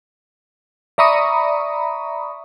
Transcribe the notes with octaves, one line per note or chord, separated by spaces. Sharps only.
D5 E5 A#5 B5 C#6 D#6